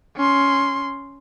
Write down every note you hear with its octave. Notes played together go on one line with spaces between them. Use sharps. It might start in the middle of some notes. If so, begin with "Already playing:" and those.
C#4 C6